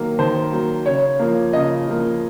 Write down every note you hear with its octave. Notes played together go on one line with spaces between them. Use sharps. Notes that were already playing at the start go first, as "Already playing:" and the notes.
Already playing: D#3 F#3 A#3
D#3 C5
F#3 A#3
C#3 C#5
F3 A#3
C#3 D#5
F3 A#3